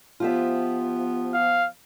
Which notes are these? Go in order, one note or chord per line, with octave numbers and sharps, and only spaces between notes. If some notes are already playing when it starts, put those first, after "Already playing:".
F3 B3 F4 G4 E5
F5